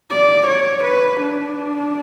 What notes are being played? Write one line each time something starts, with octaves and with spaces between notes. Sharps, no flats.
D5
C#5
B4
D4